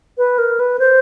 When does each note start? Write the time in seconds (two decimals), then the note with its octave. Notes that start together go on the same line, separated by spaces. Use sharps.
0.18 B4
0.38 A#4
0.60 B4
0.79 C5